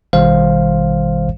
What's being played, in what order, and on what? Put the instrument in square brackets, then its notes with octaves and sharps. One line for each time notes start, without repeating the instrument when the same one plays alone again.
[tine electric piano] A1 B2 D#3 G3 C5 F5